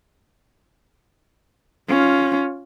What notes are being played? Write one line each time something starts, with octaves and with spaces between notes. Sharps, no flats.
C#4 F4